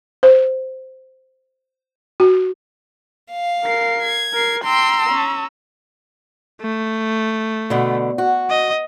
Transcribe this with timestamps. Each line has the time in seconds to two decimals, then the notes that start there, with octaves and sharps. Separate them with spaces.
0.23 C5
2.20 F#4
3.32 F5
3.64 A#4 C7
4.03 G#6
4.34 A#4 C7
4.64 G5 A#5 C6 E6
5.10 C#4
6.61 A3
7.70 B2 D3
8.18 F#4
8.50 D#5